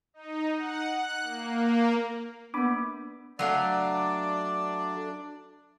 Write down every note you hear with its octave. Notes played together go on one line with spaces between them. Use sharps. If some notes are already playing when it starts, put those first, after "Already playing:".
D#4
F#5
F#6
A#3
A#3 B3 D4 B5 D6
F#3 A3 D4 D5 F5